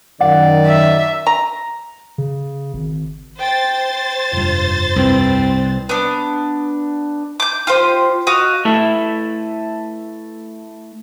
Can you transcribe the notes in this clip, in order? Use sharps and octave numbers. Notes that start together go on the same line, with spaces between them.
F#2 D#3 D5 F#5
E5
A#5
C#3
G#1
C5 G5 A6
F1 G2 F4
C2 C4 B4
B3 D4
D6 G6
F4 G4 C5
F#4 D#5 F5
A3 E4 A4 B4 E5